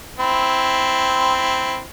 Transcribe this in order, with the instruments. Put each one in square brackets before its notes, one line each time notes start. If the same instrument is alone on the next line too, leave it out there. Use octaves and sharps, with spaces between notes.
[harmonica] C4 E4